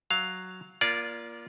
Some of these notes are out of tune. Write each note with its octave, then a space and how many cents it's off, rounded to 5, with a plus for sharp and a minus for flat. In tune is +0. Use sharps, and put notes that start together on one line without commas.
F#3 +0 F5 +0
A#3 +25 F4 -15 D5 -15